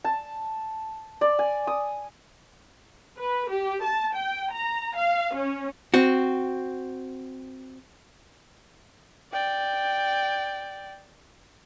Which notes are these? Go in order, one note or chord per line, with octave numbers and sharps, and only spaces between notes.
A5
D5
G#5
D#6
B4
G4
A5
G5
A#5
F5
C#4
C4 F#4
D5 G5